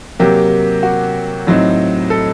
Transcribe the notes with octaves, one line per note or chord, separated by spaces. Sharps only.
C3 F#3 A#3 G4
F#4
A2 F#3 C4 D#4
A4